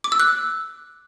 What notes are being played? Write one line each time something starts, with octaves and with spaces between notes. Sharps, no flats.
D6
E6
F#6